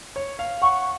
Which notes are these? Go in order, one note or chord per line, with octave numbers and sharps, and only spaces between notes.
C#5
F5
F#5 C#6